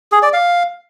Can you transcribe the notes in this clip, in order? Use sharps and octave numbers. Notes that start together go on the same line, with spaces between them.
G#4
D5
F5